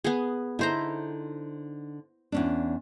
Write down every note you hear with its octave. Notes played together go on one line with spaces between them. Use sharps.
B3 G#4
D3 D#4 E4 C5 A#5
E2 C#4 D4